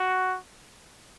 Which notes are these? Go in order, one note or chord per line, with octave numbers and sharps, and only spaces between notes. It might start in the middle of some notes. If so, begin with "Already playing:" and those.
Already playing: F#4